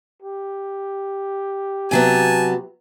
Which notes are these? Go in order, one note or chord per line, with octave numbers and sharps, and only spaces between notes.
G4
C3 F#3 B3 G#5 A5